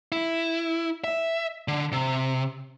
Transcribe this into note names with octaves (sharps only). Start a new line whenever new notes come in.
E4
E5
D3
C3